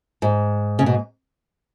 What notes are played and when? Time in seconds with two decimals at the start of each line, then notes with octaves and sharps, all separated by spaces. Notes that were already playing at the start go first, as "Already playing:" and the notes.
0.22 G#2
0.79 C#3
0.86 B2